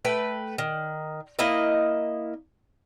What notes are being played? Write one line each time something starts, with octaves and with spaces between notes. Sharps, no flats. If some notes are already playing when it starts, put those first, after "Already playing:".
A3 B4 G5
D#3
A#3 E4 D#5